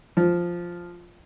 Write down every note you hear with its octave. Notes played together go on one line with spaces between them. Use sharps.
F3